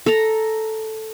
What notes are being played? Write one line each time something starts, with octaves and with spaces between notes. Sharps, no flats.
A4 A#5